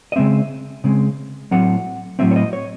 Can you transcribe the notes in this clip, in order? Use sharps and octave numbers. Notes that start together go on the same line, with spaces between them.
D#5
C#3 G#3 C4 E5
C#3 G#3 C4
A2 F#3 A3 C4 F#5
A2 F#3 A3 C4 E5
C#5
D#5
C#5